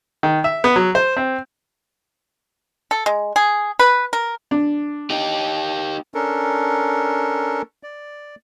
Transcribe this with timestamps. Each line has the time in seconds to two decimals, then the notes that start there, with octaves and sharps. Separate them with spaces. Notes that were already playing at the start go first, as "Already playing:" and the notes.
0.23 D#3
0.44 E5
0.64 B3
0.76 F#3
0.95 C5
1.17 C4
2.91 A4
3.06 G#3
3.36 G#4
3.79 B4
4.13 A#4
4.51 D4
5.10 D#4 G4
6.14 C#4 D4 A4 A#4
7.83 D5